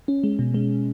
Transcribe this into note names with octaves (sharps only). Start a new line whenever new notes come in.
C#4
G#3
B2
G#3